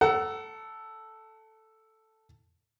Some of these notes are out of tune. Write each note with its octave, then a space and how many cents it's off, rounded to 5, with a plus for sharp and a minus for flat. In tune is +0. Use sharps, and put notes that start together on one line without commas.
A4 +0 F#5 +30 A#5 +0